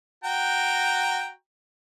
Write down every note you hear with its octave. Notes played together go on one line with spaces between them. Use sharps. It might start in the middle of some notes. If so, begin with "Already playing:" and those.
F#4 G5 A#5